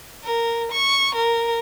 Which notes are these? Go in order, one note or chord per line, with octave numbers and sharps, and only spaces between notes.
A#4
C#6
A#4